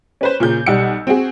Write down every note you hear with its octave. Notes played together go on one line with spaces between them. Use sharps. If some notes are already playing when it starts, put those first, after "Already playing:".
C#4 B4 C5
A#2 C#3 G6
B1 G3 F#5 E6 C#7
C4 F#4 G#4